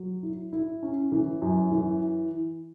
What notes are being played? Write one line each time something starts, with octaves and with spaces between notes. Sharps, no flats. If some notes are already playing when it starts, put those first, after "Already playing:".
Already playing: F#3
E4
E4
C#4
E3
F#2
E3